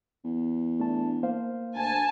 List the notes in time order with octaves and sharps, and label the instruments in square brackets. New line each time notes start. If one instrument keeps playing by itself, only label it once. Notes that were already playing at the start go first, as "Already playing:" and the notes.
[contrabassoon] E2
[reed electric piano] A3 D4 A5
A#3 C5 F5
[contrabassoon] D2 [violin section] G#5 A5